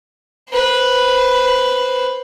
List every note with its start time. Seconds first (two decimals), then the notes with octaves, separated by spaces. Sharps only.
0.50 B4 C5